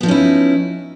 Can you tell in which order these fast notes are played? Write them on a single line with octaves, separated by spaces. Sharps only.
B3 F3 D#4 C#4 E4